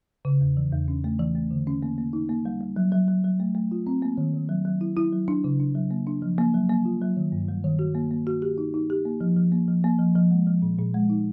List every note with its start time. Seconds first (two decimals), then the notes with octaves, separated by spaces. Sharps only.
0.25 C#3
0.41 E2
0.57 E3
0.73 E2
0.88 C#4
1.04 A3
1.19 E3
1.35 A3
1.51 D3
1.67 C#4
1.83 A#3
1.98 A#3
2.13 D#4
2.29 A#3
2.45 G3
2.61 G3
2.76 F#3
2.92 F#3
3.08 F#3
3.24 F#3
3.40 A3
3.55 A3
3.71 F4
3.87 C4
4.02 A#3
4.17 D#3
4.33 D#3
4.49 F#3
4.65 F#3
4.81 E4
4.97 E4
5.12 F#3
5.28 D4
5.44 C#3
5.60 D4
5.75 F#3
5.91 A#3
6.07 D4
6.22 F3
6.38 A#3
6.54 F#3
6.69 A#3
6.85 F4
7.02 F#3
7.16 D#3
7.32 G2
7.48 G3
7.64 D#3
7.79 F#4
7.95 A#3
8.11 A#3
8.27 F#4
8.42 G4
8.58 D#4
8.74 D#4
8.90 G4
9.05 A#3
9.21 F3
9.37 F3
9.52 A#3
9.68 F3
9.84 A#3
9.99 F3
10.15 F3
10.31 G#3
10.47 F3
10.62 A#2
10.78 A#2
10.94 G#3
11.10 D#4